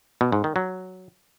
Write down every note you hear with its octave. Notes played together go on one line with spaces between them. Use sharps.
B2
G#2
D#3
F#3